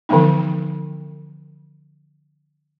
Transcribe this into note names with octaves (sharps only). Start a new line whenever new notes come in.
D3 E3 F3 A3 B3 D#4